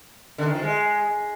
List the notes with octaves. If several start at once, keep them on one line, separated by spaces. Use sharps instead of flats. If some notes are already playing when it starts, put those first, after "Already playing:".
D3
D#3
F3
G#3